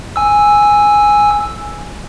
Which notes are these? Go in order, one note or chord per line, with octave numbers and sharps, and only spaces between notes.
G#5 E6